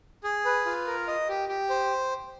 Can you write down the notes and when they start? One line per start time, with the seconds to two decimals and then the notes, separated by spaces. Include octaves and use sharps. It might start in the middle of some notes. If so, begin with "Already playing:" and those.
0.24 G#4
0.45 B4
0.66 F4
0.87 A#4
1.07 D#5
1.29 G4
1.49 G4
1.70 C5